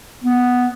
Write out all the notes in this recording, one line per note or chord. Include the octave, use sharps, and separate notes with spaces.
B3